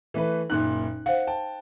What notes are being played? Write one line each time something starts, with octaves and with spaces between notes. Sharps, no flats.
E3 A3 B4
F#1 A#2 D#4 F#6
C5 F5 F#5
G5 A5